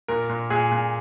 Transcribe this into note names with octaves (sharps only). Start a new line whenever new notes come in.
A#2 A#4
A#2
A#2 G#4
A#2